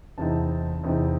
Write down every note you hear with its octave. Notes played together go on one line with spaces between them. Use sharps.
E2 C3 E3 C4 D#4 A5
E2 C3 E3 C4 D#4